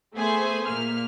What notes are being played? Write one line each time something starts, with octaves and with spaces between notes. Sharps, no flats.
A3 B3 G#4 C5 E5 G#5
A#2 A#3 F6